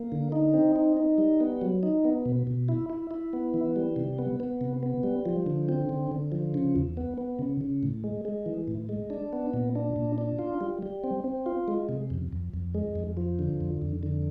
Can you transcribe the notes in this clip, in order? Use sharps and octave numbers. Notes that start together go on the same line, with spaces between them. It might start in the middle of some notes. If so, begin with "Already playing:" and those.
Already playing: A#3
D3
D#4
C4
D#4
D#4
G3
B3
F#3
D#4
B3
B2
B2
E4
E4
E4
B3
E3
G3
C3
B3
B3
C3
B3
G3
F3
D3
C4
D3
D3
F3
C#3
E2
B3
B3
C#3
C#3
A2
G#3
G#3
E3
A2
G#3
D4
B3
A#2
D4
A#2
D4
F4
G3
G3
C4
C4
F4
G#3
C3
F2
F2
F2
G#3
F2
F3
D3
F2
F2
D3